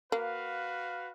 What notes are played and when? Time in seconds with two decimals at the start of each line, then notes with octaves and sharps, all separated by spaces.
0.12 A#3 F#4 B4 F5